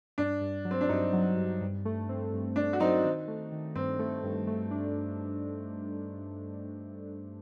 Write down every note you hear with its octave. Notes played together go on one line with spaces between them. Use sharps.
G2 D4
G2
F#3
C4
D4
G2 C4 D#4
F#3
G2
G2
A3
C4
G2
A3 D4
F#4
F#3 C4 D#4
D#3
A3
D#3
G2 C4
A3
G2
A3
D4